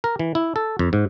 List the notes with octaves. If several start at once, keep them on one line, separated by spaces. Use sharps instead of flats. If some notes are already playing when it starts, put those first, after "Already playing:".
A#4
E3
E4
A4
F2
G#2